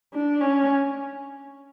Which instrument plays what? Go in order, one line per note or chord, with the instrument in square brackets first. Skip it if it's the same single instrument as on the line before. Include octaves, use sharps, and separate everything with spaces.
[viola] D4
C#4